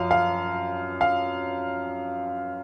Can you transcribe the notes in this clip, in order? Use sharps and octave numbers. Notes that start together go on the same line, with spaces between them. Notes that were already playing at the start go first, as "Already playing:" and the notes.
Already playing: F#2 F3 F5
F5
F5